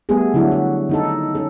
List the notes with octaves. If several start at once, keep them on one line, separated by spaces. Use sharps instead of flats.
G3 A3 B3 G#4
D3 F#3 D4 E4 F#4
F#4
D#3 D#4 A4
C#4 A4